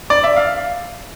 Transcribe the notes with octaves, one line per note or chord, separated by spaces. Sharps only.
D5
E5
F5